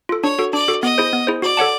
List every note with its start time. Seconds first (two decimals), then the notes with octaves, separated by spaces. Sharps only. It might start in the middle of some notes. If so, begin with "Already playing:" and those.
0.09 F4 A4
0.23 D4 C#5
0.39 F#4 A4
0.53 D4 D5
0.68 F#4 A4
0.83 B3 D#5
0.98 E4 G#4 C5
1.13 B3
1.27 E4 G#4 C5
1.42 F#4 D5
1.57 A4 C#5 F#5 A5